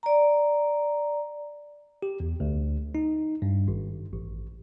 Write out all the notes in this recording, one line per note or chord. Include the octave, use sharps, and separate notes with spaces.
D5 A#5
G4
E2
D2
D#4
G2
G#1
A1